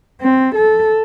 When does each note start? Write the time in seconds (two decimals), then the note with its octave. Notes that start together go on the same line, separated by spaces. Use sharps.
0.22 C4
0.55 A4